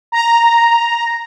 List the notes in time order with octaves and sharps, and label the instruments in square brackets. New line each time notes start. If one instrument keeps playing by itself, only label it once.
[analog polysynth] A#5